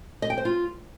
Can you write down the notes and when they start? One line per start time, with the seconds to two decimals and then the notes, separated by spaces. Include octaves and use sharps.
0.22 D#5
0.30 G5
0.37 C5
0.45 F4